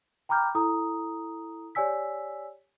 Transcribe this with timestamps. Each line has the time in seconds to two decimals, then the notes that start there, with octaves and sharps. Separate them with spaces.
0.29 G5 A#5 B5 D6 F6 G6
0.55 E4 A4 A#5 D#6
1.75 G4 C#5 D5 G#5 E6 B6